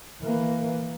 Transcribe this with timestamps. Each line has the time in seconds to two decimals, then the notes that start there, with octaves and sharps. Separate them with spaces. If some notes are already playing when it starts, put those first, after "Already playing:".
0.22 E3 A#3